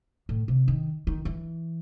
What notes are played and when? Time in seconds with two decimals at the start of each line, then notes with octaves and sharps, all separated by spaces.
0.29 A2
0.48 C3
0.68 D#3
1.07 D#3
1.25 E3